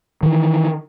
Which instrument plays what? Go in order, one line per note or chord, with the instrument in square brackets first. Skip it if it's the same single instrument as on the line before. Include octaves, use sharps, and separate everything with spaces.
[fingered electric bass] D#3 E3